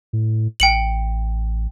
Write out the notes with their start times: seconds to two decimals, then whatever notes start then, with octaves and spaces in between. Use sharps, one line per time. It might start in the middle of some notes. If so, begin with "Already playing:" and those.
0.13 A2
0.60 A1 G5 C#7 F#7